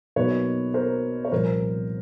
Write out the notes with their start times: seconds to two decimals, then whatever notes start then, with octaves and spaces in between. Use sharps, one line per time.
0.16 B2 F#3 A#3 D#4 B4 C#5
0.74 A#4 C5
1.25 C#5
1.32 C2 A#2 F3 A#4 C5